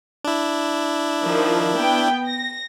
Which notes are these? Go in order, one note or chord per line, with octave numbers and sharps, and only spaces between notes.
D4 E4
D#3 F3
B3 G5
A#6